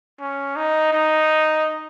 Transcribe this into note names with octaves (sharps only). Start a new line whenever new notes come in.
C#4
D#4
D#4